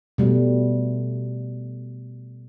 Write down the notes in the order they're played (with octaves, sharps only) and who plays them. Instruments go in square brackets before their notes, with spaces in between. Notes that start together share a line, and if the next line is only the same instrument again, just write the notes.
[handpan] B2 G3 A3